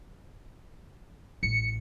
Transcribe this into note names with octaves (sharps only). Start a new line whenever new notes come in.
A1 C#7